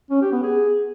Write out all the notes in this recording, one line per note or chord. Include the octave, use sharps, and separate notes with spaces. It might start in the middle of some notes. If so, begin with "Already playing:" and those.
C#4
G4
B3
G#4